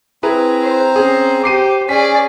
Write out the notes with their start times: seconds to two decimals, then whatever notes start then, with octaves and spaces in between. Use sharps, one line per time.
0.23 C4 E4 G#4 B4 A#5
0.62 C5
0.96 C#4 G#4
1.44 G4 C5 D6 C7 D#7
1.89 C#4 G#4 D5 B6